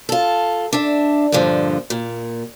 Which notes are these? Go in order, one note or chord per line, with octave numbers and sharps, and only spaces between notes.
F4 A4
D4 E5
G2 A#2 D3 F3
A#2